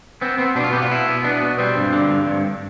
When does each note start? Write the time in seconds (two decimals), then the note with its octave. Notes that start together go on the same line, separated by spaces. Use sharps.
0.21 B3 C4
0.38 B3 C4
0.55 B2 D4
0.64 F4
0.72 B3 G4
0.82 F4
0.91 B2 E4
1.07 B3
1.24 B3 D4
1.41 B2
1.58 G3 C4
1.76 G2
1.93 D3
2.10 G2
2.27 G2